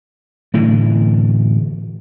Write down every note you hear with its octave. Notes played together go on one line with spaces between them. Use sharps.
A2 D3 E3